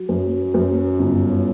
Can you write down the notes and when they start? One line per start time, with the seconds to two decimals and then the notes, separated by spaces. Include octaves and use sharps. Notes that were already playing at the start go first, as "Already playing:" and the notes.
Already playing: F#3
0.09 F#2
0.54 F#2
0.99 G1